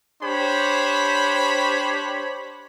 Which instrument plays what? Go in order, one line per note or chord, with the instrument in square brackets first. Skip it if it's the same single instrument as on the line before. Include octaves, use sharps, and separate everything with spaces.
[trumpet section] D4 G4 C5 C#5 B5